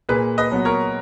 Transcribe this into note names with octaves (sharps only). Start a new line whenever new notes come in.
A#2 G#4 B4
B4 D#5
F#3 B3
A#4 C#5